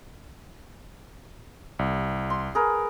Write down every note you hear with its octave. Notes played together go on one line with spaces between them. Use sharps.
C2
C6
G#4 A#4 B4